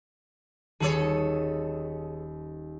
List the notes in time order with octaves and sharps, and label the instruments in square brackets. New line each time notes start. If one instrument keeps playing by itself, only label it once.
[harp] D#1 D#2 [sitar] G#4 A4 C#5